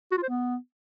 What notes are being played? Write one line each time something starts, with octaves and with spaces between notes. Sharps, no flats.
F#4
F4
C5
B3